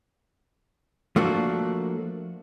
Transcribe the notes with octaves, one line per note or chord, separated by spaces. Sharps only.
F3 A3 A#3 D4 F#4